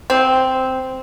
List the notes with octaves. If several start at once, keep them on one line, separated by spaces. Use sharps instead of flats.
C4